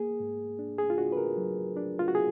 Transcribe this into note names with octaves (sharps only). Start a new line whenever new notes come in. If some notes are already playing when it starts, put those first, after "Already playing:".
Already playing: A#3 G#4
G#2
D4
G#4
F4
D4 F#4
B4
A#4
F#3
D4
F4
F#4
G#4